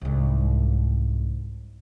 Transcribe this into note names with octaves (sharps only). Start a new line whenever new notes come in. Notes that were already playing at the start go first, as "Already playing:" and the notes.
C2 G#2